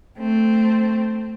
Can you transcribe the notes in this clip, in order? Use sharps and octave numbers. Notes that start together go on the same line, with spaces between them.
A3 C4